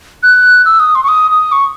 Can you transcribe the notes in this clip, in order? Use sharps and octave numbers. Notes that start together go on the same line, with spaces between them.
F#6
E6
D#6
C6
C#6
D#6
D#6
C#6